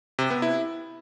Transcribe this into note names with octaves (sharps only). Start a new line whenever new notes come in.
C3
B3
E4